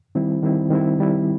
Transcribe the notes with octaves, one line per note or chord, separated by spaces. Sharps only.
D#3 G3 C4 E4
D#3 G3 C4 E4
D#3 G3 C4 E4
D#3 G3 C4 E4